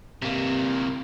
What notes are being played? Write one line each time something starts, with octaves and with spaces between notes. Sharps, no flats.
C3 A#3